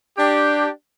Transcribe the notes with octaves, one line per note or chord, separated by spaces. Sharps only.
D4 G4